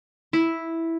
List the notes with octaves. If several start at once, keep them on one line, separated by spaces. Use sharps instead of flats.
E4